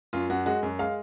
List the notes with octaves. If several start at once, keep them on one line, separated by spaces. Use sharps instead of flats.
F#2 F4
F#2 F#4
G#3 F#4
F#2
G#3 F5